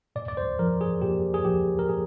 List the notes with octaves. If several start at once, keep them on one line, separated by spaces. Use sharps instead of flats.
A#2 D5
D5
C5
F3 A#4
G#4
A#2 G4
G#4
F3 G4
A#4
A#2 G#4